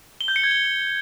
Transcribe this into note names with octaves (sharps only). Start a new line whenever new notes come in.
G7
G6
C#7
G#6
G7